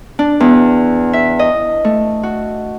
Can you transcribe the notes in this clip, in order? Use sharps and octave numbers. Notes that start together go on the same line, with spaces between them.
D4
E2
E5
D#5
A3
F#4